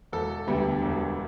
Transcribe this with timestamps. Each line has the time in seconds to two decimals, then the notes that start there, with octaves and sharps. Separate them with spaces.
0.12 E1 A4
0.47 D2 D3 G3 B3
0.82 E1